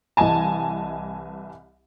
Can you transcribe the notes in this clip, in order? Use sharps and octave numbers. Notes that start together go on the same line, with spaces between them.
C2 E3 D#5 G#5 A5